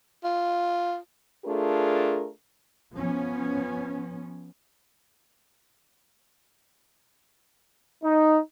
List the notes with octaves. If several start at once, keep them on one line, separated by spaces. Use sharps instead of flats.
F4
A3 D4 F4 G#4 A#4
F3 B3 C#4
D#4